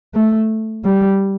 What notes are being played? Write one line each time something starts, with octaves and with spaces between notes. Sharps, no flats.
A3
G3